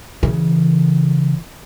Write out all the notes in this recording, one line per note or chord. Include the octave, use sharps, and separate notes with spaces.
C#3 E3